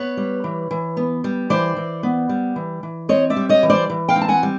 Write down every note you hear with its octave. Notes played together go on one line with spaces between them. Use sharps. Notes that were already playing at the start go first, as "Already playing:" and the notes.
Already playing: B3 B4 C#5
G3
E3
E3
B3
G3
E3 C5 D5
E3
B3
G3
E3
E3
C4 C#5 D#5
D5 E5
G3
C#5 D#5
E3
C5 D5
E3
F5 G5
C4
A5
F#5 G#5
G3